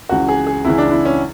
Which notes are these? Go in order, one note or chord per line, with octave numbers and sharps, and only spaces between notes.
C#2 C#3 E3 F#4
G#4
G#4
C#2 C#3 E3 E4
D4
E4
C#4